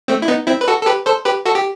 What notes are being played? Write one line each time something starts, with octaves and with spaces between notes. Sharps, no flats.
A3 C4
E4
B3 D#4
C4 E4
B4
F#4 A4
A4
G4 B4
A4 C5
G4 B4
F#4 A4
G4